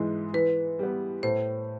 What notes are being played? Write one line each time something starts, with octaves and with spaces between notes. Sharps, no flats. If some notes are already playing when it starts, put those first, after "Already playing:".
Already playing: G#2 E3 G#3
E3 B4
G3 B3
A2 C5